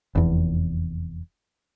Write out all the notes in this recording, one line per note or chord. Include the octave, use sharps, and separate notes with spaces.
F1 E2